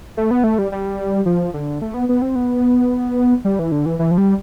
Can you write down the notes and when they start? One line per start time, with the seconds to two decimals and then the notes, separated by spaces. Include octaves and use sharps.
0.17 A3
0.31 B3
0.44 A3
0.58 G3
0.72 G3
1.26 F3
1.54 D3
1.82 A3
1.94 B3
2.09 B3
2.22 C4
2.35 B3
3.45 G3
3.59 E3
3.72 D3
3.86 E3
3.99 E3
4.11 F3
4.18 G3